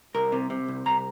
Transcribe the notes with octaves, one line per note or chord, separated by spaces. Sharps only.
C2 A#4
C3
C3
C2
C2 A#5